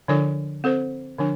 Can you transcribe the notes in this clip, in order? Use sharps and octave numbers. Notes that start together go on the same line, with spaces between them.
D3 F3 D4 A4 D5
C4 A4 C5
D3 F3 D4